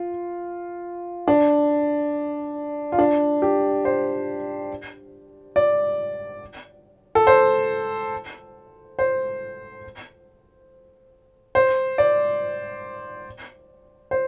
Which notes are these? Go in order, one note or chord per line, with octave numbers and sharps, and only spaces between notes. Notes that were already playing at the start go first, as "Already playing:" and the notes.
Already playing: F4
D4
F4
D4
G4
C5
D5
A4
C5
C5
C5
D5
C5